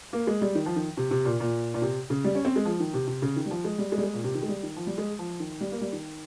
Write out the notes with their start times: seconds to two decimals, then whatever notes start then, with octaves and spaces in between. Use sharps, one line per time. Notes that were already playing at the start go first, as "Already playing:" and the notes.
0.13 A#3
0.27 G#3
0.41 G3
0.55 D#3
0.66 F3
0.76 D#3
0.97 C3
1.11 C3
1.25 A#2
1.40 A#2
1.74 A#2
1.82 C3
2.10 C#3
2.24 G3
2.35 C#4
2.45 C4
2.56 G#3
2.65 F3
2.80 D#3
2.94 C3
3.07 C3
3.22 C#3
3.36 D#3
3.46 G3
3.51 F3
3.64 G#3
3.78 G3
3.92 G#3
3.98 G3
4.03 G#3
4.14 A#2
4.24 C3
4.35 D#3
4.42 G#3
4.48 G3
4.63 D#3
4.76 F3
4.87 G3
4.98 G#3
5.19 F3
5.40 D#3
5.61 G3
5.72 A#3
5.81 G3
5.93 D#3